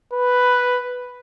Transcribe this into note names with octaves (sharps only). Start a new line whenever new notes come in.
B4